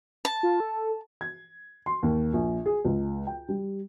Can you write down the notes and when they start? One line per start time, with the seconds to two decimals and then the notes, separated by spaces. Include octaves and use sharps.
0.25 A5
0.43 F4
0.60 A4
1.21 G#6
1.86 C6
2.03 D#2
2.33 A#1
2.66 G#4
2.85 C#2
3.27 G5
3.49 G3